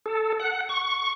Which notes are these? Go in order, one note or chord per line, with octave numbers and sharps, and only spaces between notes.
A4
F#5
C#6